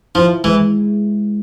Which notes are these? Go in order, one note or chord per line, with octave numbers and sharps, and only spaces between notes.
F3 E4
E3 G#3